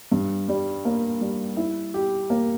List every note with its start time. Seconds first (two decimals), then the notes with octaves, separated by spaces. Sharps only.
0.12 G2
0.48 G3
0.85 A#3
1.21 G3
1.57 E4
1.94 G4
2.30 A#3